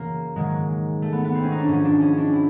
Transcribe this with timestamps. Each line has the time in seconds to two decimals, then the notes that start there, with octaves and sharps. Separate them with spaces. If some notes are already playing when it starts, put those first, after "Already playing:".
Already playing: F#2 C#3 E3 A#3
0.36 G#2 D#3 F#3 G#3
1.02 A3
1.12 B3
1.24 B3
1.34 C4
1.43 C#4
1.52 D#4
1.60 D4
1.68 G#2 F3 C#4
1.85 D4
2.01 C#4
2.17 D4
2.33 E4